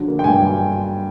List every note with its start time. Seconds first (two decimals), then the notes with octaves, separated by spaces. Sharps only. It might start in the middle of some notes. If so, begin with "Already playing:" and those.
Already playing: D3 F3 F#3
0.08 A#3
0.19 G5
0.24 G2 G#5
0.40 F#3